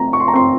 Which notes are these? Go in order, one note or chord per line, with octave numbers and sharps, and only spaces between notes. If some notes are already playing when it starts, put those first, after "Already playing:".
Already playing: A3 C4 A#5
C#6
C6
A#5
C4 C6